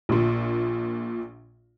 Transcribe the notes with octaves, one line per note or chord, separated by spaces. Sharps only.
A#1 A#2